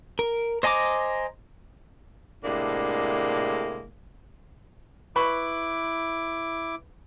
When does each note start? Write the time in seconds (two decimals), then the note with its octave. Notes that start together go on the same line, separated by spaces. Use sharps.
0.19 A#4
0.63 C5 D#5 G#5 A#5 D6
2.44 A2 C3 G#3 A#3 D4
5.16 E4 B4 B5 C#6 D6